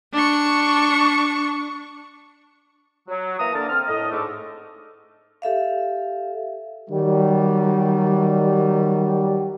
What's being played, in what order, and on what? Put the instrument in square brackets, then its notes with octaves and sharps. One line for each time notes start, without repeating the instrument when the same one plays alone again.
[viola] D4 C#6
[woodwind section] F#3
E3 A#3 E5 A#5 D#6
D3 A#3 A5
C4 F6
A2 D#5
G#2 D3 A3
[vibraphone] G4 A4 E5 F5
[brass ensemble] D#3 F#3 G3